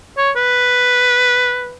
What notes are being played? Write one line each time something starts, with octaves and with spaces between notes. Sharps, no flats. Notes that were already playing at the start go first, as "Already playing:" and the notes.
C#5
B4